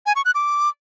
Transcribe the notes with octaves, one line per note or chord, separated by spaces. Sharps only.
G#5
C#6
F#6
D6